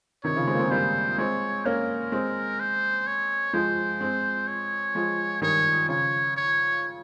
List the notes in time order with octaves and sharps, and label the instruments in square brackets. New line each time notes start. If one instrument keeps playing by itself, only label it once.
[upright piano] C3 D#3 [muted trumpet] C#5
[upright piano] C#3 F3
G#3 C4
A#3
G#3 C4
[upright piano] G3 A#3 [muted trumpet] C5
[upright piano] G#3 C4 [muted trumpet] C#5
[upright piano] A#3 C#4 [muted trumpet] A#4
[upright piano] G#3 C4
[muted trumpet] C5
C#5
[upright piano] F3 G#3 [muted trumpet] C5
[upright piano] G#3 C4
[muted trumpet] C#5
[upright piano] F3 G#3
[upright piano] D#3 G3 [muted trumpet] C#5
[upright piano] C#3 F3 [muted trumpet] C#5
[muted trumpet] C#5